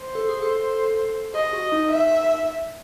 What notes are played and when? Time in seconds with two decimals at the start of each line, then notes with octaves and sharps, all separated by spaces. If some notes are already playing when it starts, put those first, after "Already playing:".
Already playing: C5
0.15 A4
0.29 G#4
0.42 A4
1.34 G#4 D#5
1.53 F#4
1.72 D#4
1.91 D#4 E5